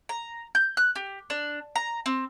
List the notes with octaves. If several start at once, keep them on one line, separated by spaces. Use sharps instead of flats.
A#5
G6
F#6
G4
D4
A#5
C4